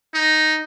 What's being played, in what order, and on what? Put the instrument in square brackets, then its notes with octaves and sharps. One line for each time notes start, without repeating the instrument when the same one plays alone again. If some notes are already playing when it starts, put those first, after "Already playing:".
[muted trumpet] D#4